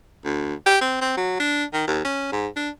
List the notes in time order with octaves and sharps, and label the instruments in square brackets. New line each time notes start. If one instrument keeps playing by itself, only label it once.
[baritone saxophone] D2
G4
C4
C4
F#3
D4
D#3
D#2
C#4
G#2
D4